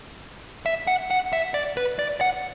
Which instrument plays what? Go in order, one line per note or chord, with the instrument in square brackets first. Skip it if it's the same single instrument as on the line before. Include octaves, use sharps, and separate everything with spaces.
[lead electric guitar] E5
F#5
F#5
E5
D5
B4
D5
F#5